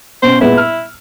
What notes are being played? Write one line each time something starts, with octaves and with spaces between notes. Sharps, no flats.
B2 C#4 C5
A#2 G#3 B3 E4
E6 F6